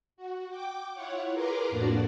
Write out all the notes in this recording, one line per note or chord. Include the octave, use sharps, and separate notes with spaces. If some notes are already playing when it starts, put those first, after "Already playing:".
F#4
G5 D6
E4 F4 C#5 F#5
G#4 A#4 B4 A#5 C6 D6
F2 A2 A#3 D4 F#4 D5